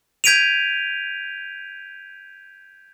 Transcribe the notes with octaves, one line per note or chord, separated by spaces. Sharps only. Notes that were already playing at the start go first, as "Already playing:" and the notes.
G6 G#6 B6 D7 D#7 F7